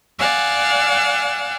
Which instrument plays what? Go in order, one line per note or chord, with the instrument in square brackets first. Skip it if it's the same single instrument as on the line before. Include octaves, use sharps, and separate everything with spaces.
[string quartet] D5 F5 F#5 G#5 E6